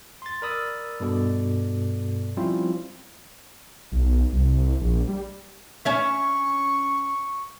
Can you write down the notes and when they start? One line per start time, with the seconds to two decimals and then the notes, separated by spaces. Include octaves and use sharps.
0.22 C6 A6
0.42 A#4 D5 B5 D#6 E6 A6
1.00 G2 B2 A4 D5
2.37 F3 G3 C4 C#4 E4 F4
3.92 B1
4.32 C2
4.81 A#1
5.08 G3
5.85 C#4 C#5 E5 C#6